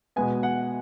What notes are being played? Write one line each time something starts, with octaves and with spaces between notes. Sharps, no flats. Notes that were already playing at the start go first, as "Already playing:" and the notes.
B2 G#3 B3 G#5
F#5